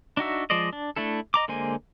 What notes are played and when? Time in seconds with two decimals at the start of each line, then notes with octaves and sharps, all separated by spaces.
0.17 D4 D#4 F#4 E5
0.50 F3 G#3 C5 D5 D#5
0.73 D4
0.96 A3 D4 E4 A4
1.34 D#5 A#5 D6
1.48 D3 G#3 A#3 C5 G#5